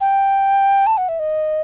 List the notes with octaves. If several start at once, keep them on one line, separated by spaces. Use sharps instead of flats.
G5
A5
F#5
E5
D#5